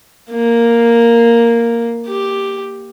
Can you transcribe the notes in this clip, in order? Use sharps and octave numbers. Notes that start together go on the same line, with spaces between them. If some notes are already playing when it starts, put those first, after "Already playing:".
A#3
G4